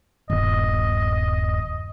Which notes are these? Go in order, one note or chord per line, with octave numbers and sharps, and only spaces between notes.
D#1 G2 D#3 B3 D#5